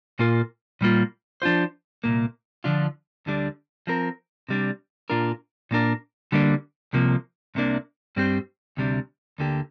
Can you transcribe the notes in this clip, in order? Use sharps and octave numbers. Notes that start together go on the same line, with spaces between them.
A#2 A#3 F4 A#4
A#2 G3 A#3 F4
F3 D4 F4 C5
C2 A#2 A#3
D3 F3 D4 F4
D2 D3 G3 D4
F3 C4 A#4
C3 G3 D4
A#2 A#3 D4 F4 A#4
A#2 A#3 D4 A#4
D3 G3 A#3 D4
C2 C3 F3 A#3
C2 C3 A#3 D4
G2 G3 C4 G4 C5
D2 C3 G3 D4
D2 D3 A#3 G4